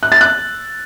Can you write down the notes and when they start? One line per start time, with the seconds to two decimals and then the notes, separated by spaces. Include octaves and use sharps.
0.03 F#6
0.12 A6
0.21 F#6